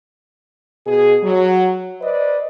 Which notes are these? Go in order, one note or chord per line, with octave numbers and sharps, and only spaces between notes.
B2 G#4
F#3
B4 C5 D5 D#5